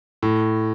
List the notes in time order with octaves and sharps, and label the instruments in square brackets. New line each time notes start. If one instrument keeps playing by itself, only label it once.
[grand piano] A2